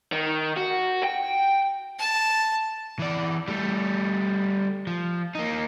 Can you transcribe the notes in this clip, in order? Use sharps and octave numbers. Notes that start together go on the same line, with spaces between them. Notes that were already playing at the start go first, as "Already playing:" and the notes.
D#3
F#4
G5
A5
E3 D5
G3 A3
F3
A#3 D#4